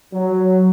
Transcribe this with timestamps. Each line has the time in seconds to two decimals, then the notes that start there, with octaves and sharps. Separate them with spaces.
0.13 F#3